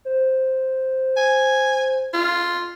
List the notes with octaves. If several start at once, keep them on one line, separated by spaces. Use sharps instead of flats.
C5
G#5
F4